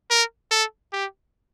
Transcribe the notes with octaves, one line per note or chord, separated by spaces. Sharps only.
A#4
A4
G4